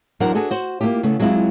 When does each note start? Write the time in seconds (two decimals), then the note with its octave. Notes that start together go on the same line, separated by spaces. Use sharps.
0.20 E2 F#3 D4 A#4 C5 F#5
0.35 D4 F#4 G#4 A4 B4
0.51 F#4 C5
0.81 A#3 C#4 E4 F4 G4
1.03 C#3 A3 B3
1.20 F#3 G#3 C4 E4 F4